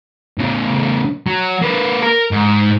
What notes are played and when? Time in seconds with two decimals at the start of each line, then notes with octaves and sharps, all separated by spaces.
0.38 A2 C#3
1.26 F#3
1.62 A#3 B4
2.03 A#4
2.32 G#2